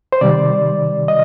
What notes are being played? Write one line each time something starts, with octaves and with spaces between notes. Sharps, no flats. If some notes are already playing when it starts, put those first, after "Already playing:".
C5
C3 D#3 G3 D5
D#5